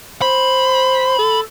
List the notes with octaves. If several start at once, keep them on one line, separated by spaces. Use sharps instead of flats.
C5 B5
A4